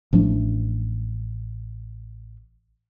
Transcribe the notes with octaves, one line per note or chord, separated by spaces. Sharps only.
A1 F3 A3 D4